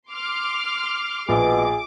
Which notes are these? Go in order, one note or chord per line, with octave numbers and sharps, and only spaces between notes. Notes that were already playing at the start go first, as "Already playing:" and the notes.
C6 D6 F6
A#1 B2 G#4 D6